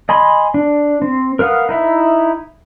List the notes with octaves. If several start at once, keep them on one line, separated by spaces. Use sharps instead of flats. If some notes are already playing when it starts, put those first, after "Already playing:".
D#5 G#5 B5 C6
D4
C4
A#4 B4 F5 F#5 D#6
D#4 E4 E5